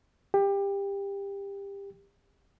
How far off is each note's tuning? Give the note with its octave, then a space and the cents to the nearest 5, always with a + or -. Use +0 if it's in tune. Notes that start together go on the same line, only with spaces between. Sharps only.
G4 +20